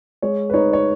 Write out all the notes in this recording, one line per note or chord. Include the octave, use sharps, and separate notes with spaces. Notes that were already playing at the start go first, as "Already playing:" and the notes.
G#3 C#5
B4
D#4 C#5
C#5